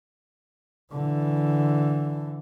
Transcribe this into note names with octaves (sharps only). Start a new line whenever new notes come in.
D3 E3